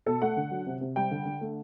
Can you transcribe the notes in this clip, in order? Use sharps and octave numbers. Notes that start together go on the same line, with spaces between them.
B2 A4
A3 F#5
D3
F#3
C3
C3
G3 G5
D3
D3
A3